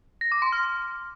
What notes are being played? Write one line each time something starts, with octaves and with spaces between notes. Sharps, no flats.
A#6
D6
C6
F6